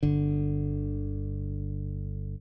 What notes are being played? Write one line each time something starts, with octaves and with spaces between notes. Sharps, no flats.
G1 D3